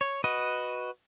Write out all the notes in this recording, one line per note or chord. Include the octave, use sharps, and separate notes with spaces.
C#5
F#4 B4 D#5